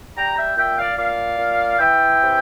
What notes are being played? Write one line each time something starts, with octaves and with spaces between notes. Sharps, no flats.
G3 G5 A#5
E5 G5
A#2 E5 G5
D5 F5
A#2 D5 F5
A#2
E3 E5 G5
C3